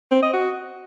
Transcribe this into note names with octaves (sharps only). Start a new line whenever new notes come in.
C4
D#5
F#4